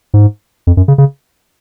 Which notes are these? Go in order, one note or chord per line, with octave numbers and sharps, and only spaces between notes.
G#2
F2
F#2
C#3
C#3